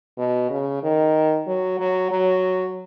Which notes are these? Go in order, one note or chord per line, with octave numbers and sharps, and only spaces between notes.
B2
C#3
D#3
F#3
F#3
F#3